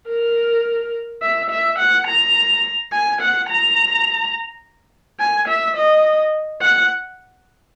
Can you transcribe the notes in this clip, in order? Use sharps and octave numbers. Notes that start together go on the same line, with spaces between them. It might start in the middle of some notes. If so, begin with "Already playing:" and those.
A#4
E5
E5
F#5
A#5
G#5
F#5
A#5
G#5
E5
D#5
F#5